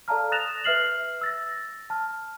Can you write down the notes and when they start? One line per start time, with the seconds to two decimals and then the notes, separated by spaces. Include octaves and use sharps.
0.08 A4 D5 F5 A5 A#5 F6
0.32 D#6 F#6 A6 A#6 E7 F7
0.64 B4 E5 F6 C7 F#7
1.21 E6 A6 A#6
1.90 A5 F6